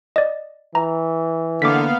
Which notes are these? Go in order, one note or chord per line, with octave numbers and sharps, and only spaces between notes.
D5 D#5
E3 A#5
D3 A#3 B3 F5 D6 B6